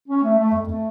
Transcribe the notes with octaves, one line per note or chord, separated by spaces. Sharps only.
C#4
A3
A3
F2
A3